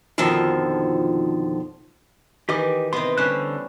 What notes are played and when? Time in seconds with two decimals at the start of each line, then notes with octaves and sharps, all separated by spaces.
0.18 F2 B2 D3 D#3 F3
2.49 D#3 E3 G4 D#5 D6
2.93 C3 B3 D#5 C6
3.17 D3 G3 C#4 C5 F#6